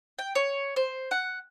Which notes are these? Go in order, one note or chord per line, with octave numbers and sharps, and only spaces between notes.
G5
C#5
C5
F#5